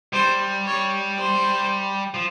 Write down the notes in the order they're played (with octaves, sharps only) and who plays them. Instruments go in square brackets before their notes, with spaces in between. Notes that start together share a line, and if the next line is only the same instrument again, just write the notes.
[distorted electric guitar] G3 [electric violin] C5
[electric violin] C#5
C5
[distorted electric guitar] F3